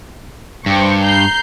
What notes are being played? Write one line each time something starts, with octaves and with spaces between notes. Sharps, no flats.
G2 C5 G5 C#6
A#5 G6 C7